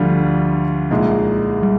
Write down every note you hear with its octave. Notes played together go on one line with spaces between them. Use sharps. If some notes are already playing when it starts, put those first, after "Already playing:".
Already playing: D2 D3 F3 G3 D4 F4
C2 A#2 G#3 D#4
G3